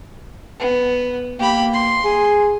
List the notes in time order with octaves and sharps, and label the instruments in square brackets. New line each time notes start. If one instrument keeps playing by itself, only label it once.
[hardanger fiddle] B3
[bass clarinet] A#3 [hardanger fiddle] G4 B5
[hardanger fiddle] C6
[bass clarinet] G#4